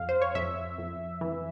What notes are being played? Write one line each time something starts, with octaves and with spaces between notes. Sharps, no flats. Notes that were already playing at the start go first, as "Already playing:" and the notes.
Already playing: F2 F5
C5
C#5
F2 E5
F2
E3